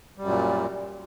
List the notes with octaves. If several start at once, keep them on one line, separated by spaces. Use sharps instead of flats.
F#2 A#2 G3